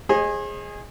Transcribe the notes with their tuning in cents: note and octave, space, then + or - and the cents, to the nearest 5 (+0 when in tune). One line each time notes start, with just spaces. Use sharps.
G#4 -10 C5 +45 D#5 +0